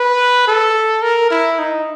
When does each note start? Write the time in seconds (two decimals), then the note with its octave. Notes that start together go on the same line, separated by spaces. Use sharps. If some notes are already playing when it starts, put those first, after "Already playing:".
Already playing: B4
0.47 A4
1.02 A#4
1.30 E4
1.59 D#4